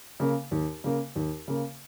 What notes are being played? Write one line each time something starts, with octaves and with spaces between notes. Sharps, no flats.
C#3 A#3
D#2
C#3 A#3
D#2
C#3 A#3